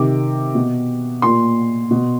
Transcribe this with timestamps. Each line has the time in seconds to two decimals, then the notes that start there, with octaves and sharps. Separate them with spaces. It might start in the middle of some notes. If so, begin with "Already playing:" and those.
Already playing: C3 D#3 D6
0.55 B2
1.22 A#2 C6
1.91 B2